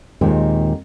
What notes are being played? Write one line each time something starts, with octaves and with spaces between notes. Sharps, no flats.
D#2 A#2 D#3 G#3 C4